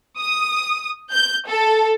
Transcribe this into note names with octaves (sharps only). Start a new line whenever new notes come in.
D#6
G6
A4